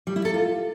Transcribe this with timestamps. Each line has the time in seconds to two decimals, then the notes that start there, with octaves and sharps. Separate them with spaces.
0.07 G3
0.16 E4
0.25 A4
0.34 F4